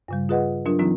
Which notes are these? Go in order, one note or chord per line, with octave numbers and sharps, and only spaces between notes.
G2 C#3 G3
F4 G#4 B4 D#5 F#5
F#3 D4 F4 A#4
E3 F#3 C4 D#4 F4